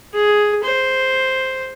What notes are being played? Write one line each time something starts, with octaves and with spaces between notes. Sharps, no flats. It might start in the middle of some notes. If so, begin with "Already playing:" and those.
G#4
C5